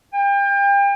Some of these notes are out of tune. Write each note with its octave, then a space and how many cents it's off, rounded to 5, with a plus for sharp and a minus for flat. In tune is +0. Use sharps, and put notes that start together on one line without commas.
G5 +35